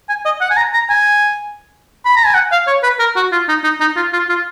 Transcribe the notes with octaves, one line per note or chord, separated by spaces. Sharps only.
G#5
D#5
F#5
G#5
A#5
A#5
G#5
B5
A#5
G#5
F#5
F5
C#5
B4
A#4
F#4
F4
D#4
D#4
D#4
F4
F4
F4